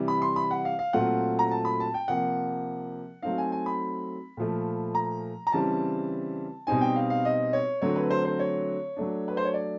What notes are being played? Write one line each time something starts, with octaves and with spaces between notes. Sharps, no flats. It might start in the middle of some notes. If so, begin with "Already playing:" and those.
Already playing: C3 E3 G3
B5
C6
B5
F#5
F5
F5
A#2 F#3 A3 C4 F4 F#5
A#5
A5
B5
A5
G5
C3 F3 A#3 F#5
F#3 A3 C4 D#4 F5
G#5
G#5
B5
A#2 F3 A3
A#5
A#5
C#3 E3 G3 C4 A5
B2 G3 C4 D#4 G#5
G5
F5
F5
D#5
C#5
D3 F#3 A3 C4 C#5
B4
C5
C5
C#5
F#3 A3 D4
B4
C5
C#5
D5